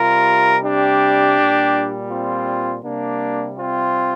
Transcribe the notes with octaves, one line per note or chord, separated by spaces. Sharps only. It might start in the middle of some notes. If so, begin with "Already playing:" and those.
Already playing: C3 G3 F4 A#4
D4 G4
A#2 G3
C4 F4
C3 G3 A#3 D4
C4 F4